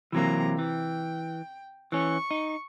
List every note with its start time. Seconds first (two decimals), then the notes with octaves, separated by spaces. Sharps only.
0.12 C3 E3 F#3 A#3 A#5
0.59 E3 G5
1.92 E3 C#4 C#6
2.31 D#4